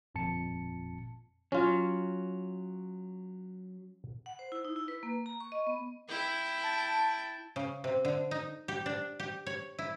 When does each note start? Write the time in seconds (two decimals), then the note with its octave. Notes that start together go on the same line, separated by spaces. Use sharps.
0.15 G1 F2 A#2 A5 C#7
1.52 F#3 C#4 F4
4.26 F#5
4.39 C5
4.52 E4
4.65 D#4
4.76 E4
4.88 B4
5.03 A#3
5.26 A#5
5.40 C#6
5.52 D#5
5.67 B3
6.09 E4 G5
6.64 A5
7.56 C#3
7.84 C3
8.05 D3
8.31 D#4
8.68 G4
8.86 D4
9.19 G4
9.46 C#5
9.79 E4